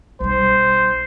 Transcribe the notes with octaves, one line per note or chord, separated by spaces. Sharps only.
B1 G3 C5